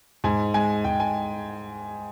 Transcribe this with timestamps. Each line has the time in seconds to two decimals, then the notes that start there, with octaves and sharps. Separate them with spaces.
0.24 G#2 G#5
0.54 G#3 G#5
0.85 G#2 G5
1.00 G#5